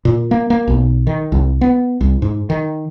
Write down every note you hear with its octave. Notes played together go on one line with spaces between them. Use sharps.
A#2
A#3
A#3
B1
D#3
C2
B3
C2
G#2
D#3